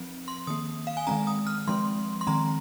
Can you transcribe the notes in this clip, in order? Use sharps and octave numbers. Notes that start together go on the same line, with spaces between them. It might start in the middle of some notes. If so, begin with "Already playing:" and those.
Already playing: F3 C4
C6
D#3 A#3 D#6
F5
G#5
D#3 G#3 C4 A#5
D#6
F6
F3 G#3 C4 C6
C6
D#3 G#3 C4 A#5